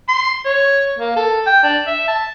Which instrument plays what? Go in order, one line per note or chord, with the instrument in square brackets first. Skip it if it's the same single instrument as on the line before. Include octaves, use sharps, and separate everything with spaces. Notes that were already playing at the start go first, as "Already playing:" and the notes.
[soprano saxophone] C6
C#5
A#3
A4
G5
D4
E5
A5